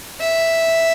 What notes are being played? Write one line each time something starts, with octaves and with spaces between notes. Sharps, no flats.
E5